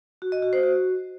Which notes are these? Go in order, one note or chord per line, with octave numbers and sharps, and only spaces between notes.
F#4
D#5
F#4
C5
F#4